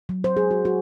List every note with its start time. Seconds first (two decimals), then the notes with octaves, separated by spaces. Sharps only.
0.09 F#3
0.24 C5
0.37 G#4
0.51 F#4
0.65 F#4